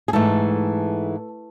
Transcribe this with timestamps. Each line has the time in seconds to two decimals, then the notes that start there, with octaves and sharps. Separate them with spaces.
0.08 G#4
0.13 G#2 E3 A3 A4